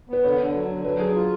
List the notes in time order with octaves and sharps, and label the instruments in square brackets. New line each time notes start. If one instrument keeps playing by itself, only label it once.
[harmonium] B3 [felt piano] B4
[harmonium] D3 [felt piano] C#5
[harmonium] D3
F#3
D3
[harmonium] F#3 [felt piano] B4
[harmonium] F#3 [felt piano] G#4
[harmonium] F4